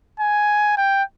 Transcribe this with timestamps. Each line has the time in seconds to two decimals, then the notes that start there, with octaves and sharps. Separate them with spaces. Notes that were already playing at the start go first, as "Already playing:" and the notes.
0.20 G#5
0.77 G5